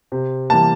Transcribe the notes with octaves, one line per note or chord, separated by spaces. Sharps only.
C3
E3 G3 A#3 A5